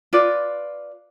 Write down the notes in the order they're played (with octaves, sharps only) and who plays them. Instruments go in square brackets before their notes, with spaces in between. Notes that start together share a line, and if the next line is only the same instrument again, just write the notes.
[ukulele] F4 B4 D5